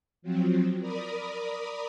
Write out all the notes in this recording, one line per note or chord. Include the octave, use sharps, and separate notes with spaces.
F3 F#3 C4
A#4 D5 B5 D#6